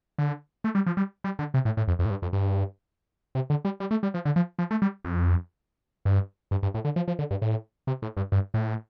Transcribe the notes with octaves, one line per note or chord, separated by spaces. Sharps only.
D3
A3
G3
F3
G3
G3
D3
C3
A2
A2
F2
F2
A2
G2
F2
G2
C3
D3
G3
G3
A3
G3
F3
D3
F3
F3
A3
G3
F2
G2
G2
G2
A2
D3
F3
F3
D3
G2
A2
C3
A2
G2
G2
A2